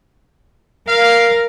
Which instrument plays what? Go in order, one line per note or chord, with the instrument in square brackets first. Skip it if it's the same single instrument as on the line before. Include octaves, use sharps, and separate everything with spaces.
[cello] A#4 [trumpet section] F5